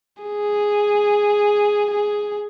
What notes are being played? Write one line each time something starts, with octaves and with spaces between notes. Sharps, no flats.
G#4
G#4